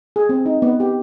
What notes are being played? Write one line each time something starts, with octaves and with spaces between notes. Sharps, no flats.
G#4
C4
D#4
B3
G4